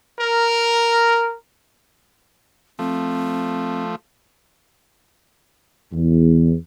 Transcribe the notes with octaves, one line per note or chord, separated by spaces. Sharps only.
A#4
F3 A3 C4
E2